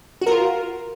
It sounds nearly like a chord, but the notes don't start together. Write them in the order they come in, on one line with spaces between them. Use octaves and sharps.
F#4 A#4 F4